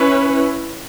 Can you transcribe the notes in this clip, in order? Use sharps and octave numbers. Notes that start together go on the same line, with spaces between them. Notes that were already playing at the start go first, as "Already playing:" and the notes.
Already playing: C#4 E4 B4